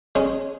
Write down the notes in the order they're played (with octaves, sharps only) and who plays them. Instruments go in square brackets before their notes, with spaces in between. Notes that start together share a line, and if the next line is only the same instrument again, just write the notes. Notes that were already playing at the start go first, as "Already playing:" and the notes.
[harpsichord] G#3 C#4